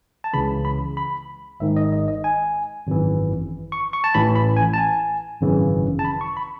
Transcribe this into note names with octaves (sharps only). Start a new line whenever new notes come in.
A5
C#2 C#3 E3 B5
B5
B5
G#1 G#2 D#3 E5
D#5
D#5
D#5
G#5
G#1 F#2 E3
C#6
C#6
A5
A1 A2 E3 B5
B5
G#5
A5
G#5
G#1 F#2 C#3 E3
A5
B5
C#6
B5